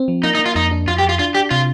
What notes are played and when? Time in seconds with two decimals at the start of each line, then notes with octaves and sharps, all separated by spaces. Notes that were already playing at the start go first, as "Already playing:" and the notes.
Already playing: C4
0.08 F3
0.23 A#3 D#4
0.35 D#4
0.39 A#3
0.46 F4
0.55 F2 D#4
0.71 D4
0.87 F2 F4
0.98 G4
1.03 F2
1.09 F4
1.19 D4 F4
1.35 D4 G4
1.51 C3 F4